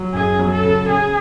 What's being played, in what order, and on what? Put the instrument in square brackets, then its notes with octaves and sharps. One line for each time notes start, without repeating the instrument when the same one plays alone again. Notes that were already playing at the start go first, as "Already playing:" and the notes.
Already playing: [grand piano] F#3
[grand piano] F#2 [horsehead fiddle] G#4
[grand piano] F#3
[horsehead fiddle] A4
[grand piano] C#3
[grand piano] C#3 [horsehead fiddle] G#4